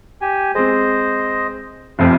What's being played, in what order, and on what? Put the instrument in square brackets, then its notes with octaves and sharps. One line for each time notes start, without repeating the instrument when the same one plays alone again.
[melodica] G4 G#5
[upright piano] G#3 C4 [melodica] C5 D#5
[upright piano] F1 F2 C4 [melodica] G4 E5 F5